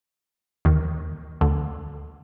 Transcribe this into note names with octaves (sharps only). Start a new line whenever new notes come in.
D#2 D#3
D2 D3